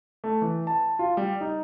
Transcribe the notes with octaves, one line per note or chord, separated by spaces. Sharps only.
A3
E3
A5
F4
G3
D#4